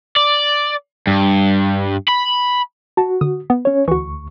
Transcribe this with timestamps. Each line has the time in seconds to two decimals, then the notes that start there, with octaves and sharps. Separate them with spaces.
0.16 D5
1.07 G2
2.08 B5
2.97 F#4 A5
3.21 D3 D#6
3.50 B3
3.65 C#4 C#5
3.88 D2 E3 F#4 C#6